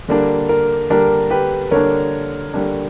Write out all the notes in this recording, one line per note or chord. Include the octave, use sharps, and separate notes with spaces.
D3 G3 A#3 D4
A#4
D3 G3 A#3 D4 A#4
G4 B4
D3 G3 A#3 D4 A#4 C#5
D3 G3 A#3 D4